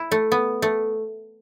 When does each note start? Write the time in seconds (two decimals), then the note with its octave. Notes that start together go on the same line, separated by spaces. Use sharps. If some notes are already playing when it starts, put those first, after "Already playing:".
Already playing: E4
0.11 A3
0.32 B3
0.62 A3